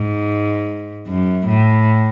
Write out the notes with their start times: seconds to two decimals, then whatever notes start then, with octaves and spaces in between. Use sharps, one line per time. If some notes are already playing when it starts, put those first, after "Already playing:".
Already playing: G#2
1.06 F#2
1.47 A2